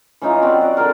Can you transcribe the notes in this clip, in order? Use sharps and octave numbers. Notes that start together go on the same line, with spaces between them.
E3 C#4 D#4 F4
C4 F#4 D5
F#4 D5
D3 D4 A#4